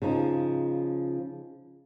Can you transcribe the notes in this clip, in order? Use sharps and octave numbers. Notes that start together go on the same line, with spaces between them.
C#3 F3 D#4